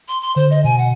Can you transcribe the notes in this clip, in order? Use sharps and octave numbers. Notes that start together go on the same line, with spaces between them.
C6
C6
D3 C5
D#5
B2 G#5
F#5